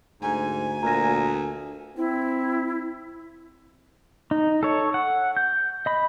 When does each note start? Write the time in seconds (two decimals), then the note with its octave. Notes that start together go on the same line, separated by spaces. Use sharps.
0.22 D2 G#2 G#5
0.83 D2 A#2 A#5 A#6
1.97 C4 E4
4.31 D#4
4.63 A4 C#5
4.94 F#5
5.37 G6
5.86 D#5 B5